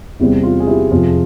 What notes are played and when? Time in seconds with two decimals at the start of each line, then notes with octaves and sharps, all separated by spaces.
0.20 E2 C3 G3 C4 E4
0.43 F4
0.60 G#4
0.67 E4 G4
0.91 F2 C3 F3 F4 G#4